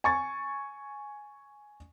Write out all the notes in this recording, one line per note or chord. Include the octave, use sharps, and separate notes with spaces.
G#5 C#6 A6